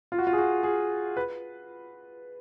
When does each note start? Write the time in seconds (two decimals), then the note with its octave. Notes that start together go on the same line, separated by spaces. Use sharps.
0.12 F4
0.18 F#4
0.27 F4
0.33 G#4
0.38 F#4
0.63 G#4
1.17 B4